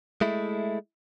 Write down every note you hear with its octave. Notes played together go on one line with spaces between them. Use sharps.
G#3 A3 E4